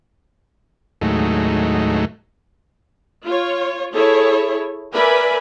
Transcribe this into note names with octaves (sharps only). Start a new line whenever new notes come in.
D#2 A2 F#3 G#3 A3 D#4
F4 C#5
E4 G#4 A4 C#5
A#4 B4 D5 E5 G#5 B5